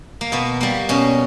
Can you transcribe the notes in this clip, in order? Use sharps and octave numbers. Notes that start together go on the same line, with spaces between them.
A#3
B2 B3
G3 A#3
B2 C#4